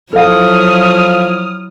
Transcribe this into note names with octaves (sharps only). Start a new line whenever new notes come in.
F3 F#3 E4 A4 F5 D#6 F6